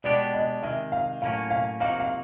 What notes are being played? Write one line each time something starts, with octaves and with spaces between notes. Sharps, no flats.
B2 G#3 B3 D4 G4 D5
D#5
C3 D#3 G#3 E5
F5
A2 F#3 A#3 C#4 F5
F5
C3 F3 A#3 D#4 F#4 F5
F5